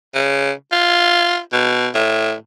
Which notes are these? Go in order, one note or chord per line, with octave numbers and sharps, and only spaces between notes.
C#3
F4
B2
A2